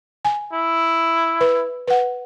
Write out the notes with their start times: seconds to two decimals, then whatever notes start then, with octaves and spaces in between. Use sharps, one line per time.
0.25 G#5
0.53 E4
1.41 B4
1.88 B4 F#5